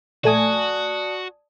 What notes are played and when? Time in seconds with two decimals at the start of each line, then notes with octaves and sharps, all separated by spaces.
0.24 A#1 A3 F#4 D5 G#5 A5 D#6